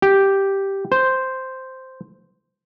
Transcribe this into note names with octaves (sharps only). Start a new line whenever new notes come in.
G4
C5